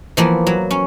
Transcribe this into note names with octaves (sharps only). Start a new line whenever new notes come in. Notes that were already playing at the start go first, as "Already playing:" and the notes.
E3 F3 A#3 B3
F#3
C#4